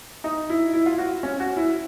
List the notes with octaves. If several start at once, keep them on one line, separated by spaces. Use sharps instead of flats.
D#4
E4
E4
F4
F#4
C#4
F#4
E4